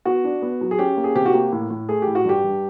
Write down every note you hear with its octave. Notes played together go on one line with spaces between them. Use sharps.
B3 F#4
D4
B3
F#3
G#4
C#4 G4
A#3
G#4
C3 G4
F#4
A#3 G4
A2
A2
A3 G#4
G4
A2
F#4
G2 G4
G2